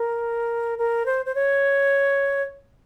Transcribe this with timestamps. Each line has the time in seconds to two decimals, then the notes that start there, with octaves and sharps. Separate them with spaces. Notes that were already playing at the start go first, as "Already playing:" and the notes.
Already playing: A#4
0.78 A#4
1.06 C5
1.26 C5
1.35 C#5